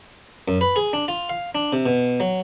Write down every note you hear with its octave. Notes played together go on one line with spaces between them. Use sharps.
F#2
B4
G#4
D4
F4
F5
D4
C3
B2
F#3